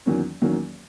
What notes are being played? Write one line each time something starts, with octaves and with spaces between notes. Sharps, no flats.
E2 D#3 F#3 A#3 C#4
E2 D#3 F#3 A#3 C#4